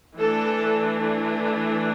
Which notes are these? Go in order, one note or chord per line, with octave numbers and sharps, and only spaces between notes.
E3 A3 D4 A4